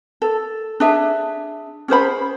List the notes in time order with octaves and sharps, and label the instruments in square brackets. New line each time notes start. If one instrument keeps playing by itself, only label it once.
[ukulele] A4
D4 G#4 E5
C#4 G#4 C5 B5